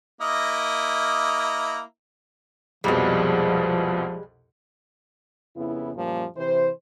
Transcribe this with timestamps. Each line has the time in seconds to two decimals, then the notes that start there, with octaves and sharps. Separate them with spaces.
0.21 A#3 E4 D#5
2.84 C2 F2 B2 F3 G3 G#3
5.56 F2 C#3 B3 E4
5.94 F#2 A#2 F3 G3 A#3
6.36 C3 E3 C5